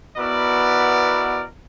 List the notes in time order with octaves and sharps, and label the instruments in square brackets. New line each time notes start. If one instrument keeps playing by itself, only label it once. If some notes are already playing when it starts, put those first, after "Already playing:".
[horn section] B2 B3 E4 A#4 D5